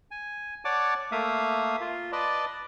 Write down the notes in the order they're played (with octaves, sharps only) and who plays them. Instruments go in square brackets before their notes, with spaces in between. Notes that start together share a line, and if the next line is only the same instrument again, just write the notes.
[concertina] G#5
C#5 D5 F#5 A5 D6
A3 A#3 E5 F5 D#6
F4
B4 D5 D#5 A5